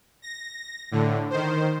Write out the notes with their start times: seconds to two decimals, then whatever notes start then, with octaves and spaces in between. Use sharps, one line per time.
0.22 A#6
0.91 A2 D3
1.30 D#3 C5